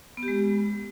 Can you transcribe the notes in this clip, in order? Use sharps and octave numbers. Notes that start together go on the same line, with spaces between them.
B3
G4
G#3